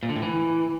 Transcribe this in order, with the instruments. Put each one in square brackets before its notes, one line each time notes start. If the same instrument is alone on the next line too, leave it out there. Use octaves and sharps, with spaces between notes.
[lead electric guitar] A#2
D3
A2
E3